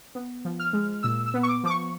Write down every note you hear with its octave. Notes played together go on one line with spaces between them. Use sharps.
B3
F3
F6
G#3
A#2 E6
E6
B3
C#6
D6
F3 D6
C#6